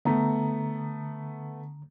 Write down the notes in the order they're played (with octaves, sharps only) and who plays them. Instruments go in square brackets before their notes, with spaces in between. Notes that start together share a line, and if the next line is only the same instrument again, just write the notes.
[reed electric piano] D3 A#5 [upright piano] A3 B3